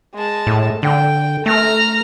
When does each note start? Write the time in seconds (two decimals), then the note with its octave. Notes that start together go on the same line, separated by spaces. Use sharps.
0.14 G#3 A5
0.47 A2
0.83 D3 G5
1.46 A3 A#5 F6